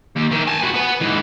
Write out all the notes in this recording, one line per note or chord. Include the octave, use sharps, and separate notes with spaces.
D#2
D#3 E3
G#5 A5
E4 F#4
B3 B4
G#2 E3